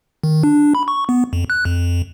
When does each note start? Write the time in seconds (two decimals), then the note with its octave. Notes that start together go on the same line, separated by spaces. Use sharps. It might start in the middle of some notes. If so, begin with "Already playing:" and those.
0.23 D#3
0.43 D4
0.75 B5
0.88 C#6
1.09 B3
1.33 F2
1.50 F#6
1.65 F2